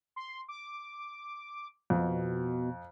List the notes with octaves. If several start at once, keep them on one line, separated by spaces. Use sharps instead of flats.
C6
D6
F2 B2